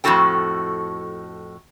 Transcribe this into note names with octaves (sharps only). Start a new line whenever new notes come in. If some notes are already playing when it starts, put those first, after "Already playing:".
F2 A2 G#3 F#4 A4 G5